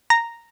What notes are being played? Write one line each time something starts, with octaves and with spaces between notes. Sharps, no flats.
A#5